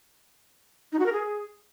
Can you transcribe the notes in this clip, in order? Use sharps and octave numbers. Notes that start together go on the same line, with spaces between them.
D#4
F#4
A#4
G#4